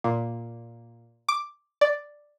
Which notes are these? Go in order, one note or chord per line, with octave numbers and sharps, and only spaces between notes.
A#2
D6
D5